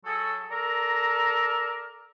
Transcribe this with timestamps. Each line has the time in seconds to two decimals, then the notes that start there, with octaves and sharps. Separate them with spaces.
0.06 F#3 F#4 G#4 A4
0.51 A4 A#4 D5 A#5